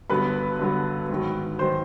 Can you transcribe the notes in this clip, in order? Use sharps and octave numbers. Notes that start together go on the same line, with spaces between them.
G2 D3 F#3 B3 B4 B5
G2 D3 F#3 B3
G#2 D#3 F#3
D#3 F#3 C5 C6